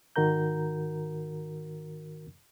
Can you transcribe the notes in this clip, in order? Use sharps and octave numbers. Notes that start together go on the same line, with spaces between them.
G#2 D#3 F#4 A#4 A#5 G6